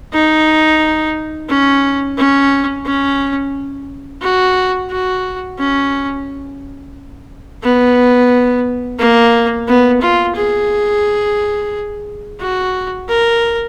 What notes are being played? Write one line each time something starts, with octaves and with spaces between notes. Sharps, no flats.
D#4
C#4
C#4
C#4
F#4
F#4
C#4
B3
A#3
B3
F4
G#4
F#4
A#4